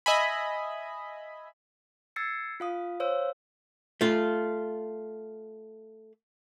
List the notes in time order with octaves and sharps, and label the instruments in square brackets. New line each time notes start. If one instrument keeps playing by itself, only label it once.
[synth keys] D#5 E5 G#5 B5
[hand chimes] E6 G#6 A6 C7 C#7
F4 F5 D#6
C5 C#5 F5 E6
[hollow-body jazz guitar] A3 F4